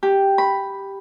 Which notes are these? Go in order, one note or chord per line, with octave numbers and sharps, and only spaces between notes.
G4
B5